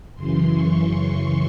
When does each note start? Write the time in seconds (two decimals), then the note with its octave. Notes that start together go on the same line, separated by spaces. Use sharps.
0.15 F#2 C#3 E3 C6
0.53 C#6
0.91 C#6